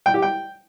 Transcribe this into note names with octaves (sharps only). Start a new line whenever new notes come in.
G5
G4
G5